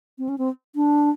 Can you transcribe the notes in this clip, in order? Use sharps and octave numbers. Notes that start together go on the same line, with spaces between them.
C4
C#4
C4
D4